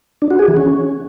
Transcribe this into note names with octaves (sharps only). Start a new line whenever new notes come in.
D4
F#4
G#4
E3
C#4